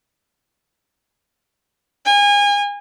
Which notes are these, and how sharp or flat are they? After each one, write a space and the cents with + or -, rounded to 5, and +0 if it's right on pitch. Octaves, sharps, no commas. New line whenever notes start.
G#5 -30